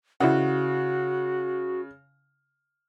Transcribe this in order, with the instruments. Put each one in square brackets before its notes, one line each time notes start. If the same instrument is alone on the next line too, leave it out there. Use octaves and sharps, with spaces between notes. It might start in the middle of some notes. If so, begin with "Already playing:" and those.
[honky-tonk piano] C#3 [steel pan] E4 D5 F#5 [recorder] F#4